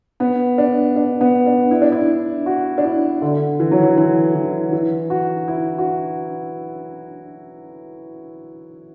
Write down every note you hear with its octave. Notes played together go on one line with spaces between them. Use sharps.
B3
D4
D4
B3
D4
E4
D4
E4
F#4
D4
E4
D3
E3
F#3
E3
E3
E3
E3
F#4
E4
F#4